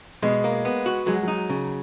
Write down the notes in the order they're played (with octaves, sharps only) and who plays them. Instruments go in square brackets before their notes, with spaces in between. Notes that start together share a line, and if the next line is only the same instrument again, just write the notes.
[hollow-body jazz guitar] B2 [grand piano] G#3
[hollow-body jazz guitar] A#3
B3
F#4
[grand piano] F#3 [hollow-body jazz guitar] G#3
[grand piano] F#3
[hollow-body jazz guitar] D#4
C#3